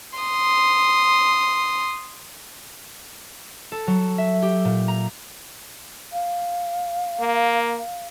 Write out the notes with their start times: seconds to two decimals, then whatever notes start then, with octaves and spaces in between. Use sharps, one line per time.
0.19 C6 D#6
3.72 A4
3.87 F#3
4.18 E5
4.42 G4
4.65 A#2
4.88 A#5
6.13 F5
7.20 A#3